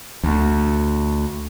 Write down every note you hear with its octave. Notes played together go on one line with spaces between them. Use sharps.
D2